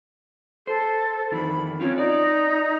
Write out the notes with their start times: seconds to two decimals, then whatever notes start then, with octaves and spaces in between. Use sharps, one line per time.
0.67 A4 C5
1.32 F2 D#3 E3 B5
1.81 C4 C#4 F4
1.98 D#4 D5